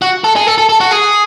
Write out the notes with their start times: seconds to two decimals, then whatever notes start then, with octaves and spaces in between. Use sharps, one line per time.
0.02 F#4
0.24 A4
0.36 G#4
0.47 A4
0.58 A4
0.69 A4
0.81 F#4
0.91 G#4